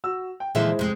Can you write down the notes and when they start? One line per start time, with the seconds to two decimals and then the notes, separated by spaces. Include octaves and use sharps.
0.04 F#4 E6
0.40 G5
0.55 D#2 A#2 D3 E3 F3 G#3 E4 E5
0.79 F2 C3 G#3